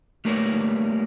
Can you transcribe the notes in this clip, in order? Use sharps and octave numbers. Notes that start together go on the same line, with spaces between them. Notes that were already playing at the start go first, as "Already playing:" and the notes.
G3 A3 A#3 A#4 B4 C#5